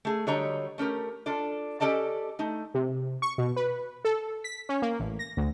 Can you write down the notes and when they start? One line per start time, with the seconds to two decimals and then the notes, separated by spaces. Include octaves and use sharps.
0.05 A3 G#4
0.27 D3 F#3 G3 C#5 D#5 A#5
0.78 A3 C#4 G4 A#4
1.26 D4 F4 A4 D5
1.80 C#4 G4 A4 D5 D#5 A5
2.39 A3 D#4
2.74 C3
3.22 C#6
3.38 B2
3.56 B4
4.05 A4
4.44 B6
4.69 C#4
4.82 A#3
4.99 A1
5.19 A#6
5.37 D2